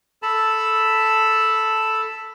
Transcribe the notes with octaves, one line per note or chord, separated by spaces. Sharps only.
A4 A5 B5